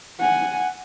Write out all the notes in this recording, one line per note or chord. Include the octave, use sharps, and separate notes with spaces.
F#5 G#5